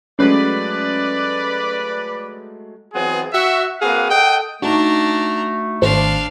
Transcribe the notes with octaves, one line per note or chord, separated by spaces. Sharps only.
F#3 G#3 A3 C#4 B4 D5
E3 F#3 B3 C4 F4 G#4
F#4 E5
A#3 C4 F#4 G#4 B4 F5
A4 D#5 F#5 G5
A3 D4 D#4 F#4 A#5
G#1 D4 C5 F5